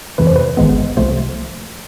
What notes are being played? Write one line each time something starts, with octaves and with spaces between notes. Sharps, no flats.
F2 C3 E3 A3 B4
C5
B4
G#1 G#2 D#3 G#3 B3
C2 C3 F3 A3 C5